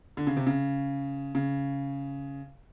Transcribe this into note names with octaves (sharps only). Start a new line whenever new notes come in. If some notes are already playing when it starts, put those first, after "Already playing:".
D3
C#3
C3
C#3
C#3